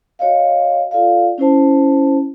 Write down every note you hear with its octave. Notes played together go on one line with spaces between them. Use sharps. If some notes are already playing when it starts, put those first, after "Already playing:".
F#4 C#5 D#5 F5
F4 A4 D5 F5
C#4 E4 C5 A5